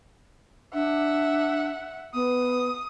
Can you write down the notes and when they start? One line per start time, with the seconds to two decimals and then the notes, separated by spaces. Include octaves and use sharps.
0.74 D4 E5 F#5
2.14 B3 D#6